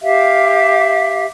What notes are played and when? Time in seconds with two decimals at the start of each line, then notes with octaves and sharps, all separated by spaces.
0.01 G4 E5 F5